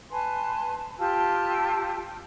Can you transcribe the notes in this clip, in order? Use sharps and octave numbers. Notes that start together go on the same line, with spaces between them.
B4 G#5 A5 C6
F4 G4 A5 E6